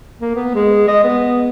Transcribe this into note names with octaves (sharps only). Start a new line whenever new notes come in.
A#3
B3
G#3
D#5
B3